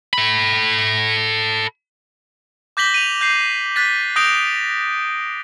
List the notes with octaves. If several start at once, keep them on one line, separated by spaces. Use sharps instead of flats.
A4 B5
D6 G6 A#6 B6 F#7 G7
D#7 F7
G6 C7
F#6 A6 B6
D#6 G6 A#6 D7 F7 G7